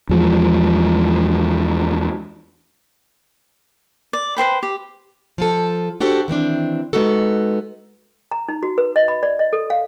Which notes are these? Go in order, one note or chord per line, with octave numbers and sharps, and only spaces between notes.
E2 F3 G#3
D5
B4 C5 G5 B5
G4
F3 F4 A4
D4 F#4 G4 A4 C5
D#3 E3 C4 D4
G#3 B3 D#4 F#4 A4
A#5
D#4
F#4
B4
D#5
B5
D5
D#5
A4
F5